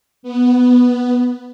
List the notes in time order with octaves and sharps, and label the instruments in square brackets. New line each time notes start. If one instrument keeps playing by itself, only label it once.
[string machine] B3